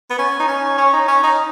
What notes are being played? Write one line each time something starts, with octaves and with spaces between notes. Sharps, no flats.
B3
C#4
D#4
C#4
C#4
D#4
C#4
D#4